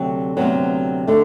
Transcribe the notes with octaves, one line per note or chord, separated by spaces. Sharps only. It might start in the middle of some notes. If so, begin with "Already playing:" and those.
Already playing: D2 C3 F#3
D2 C3 F#3 B3
D3 A3